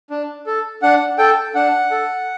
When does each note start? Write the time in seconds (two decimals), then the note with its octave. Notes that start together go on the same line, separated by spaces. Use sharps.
0.10 D4
0.46 A4
0.82 D4 F#5
1.18 A4 G5
1.55 D4 F#5
1.91 A4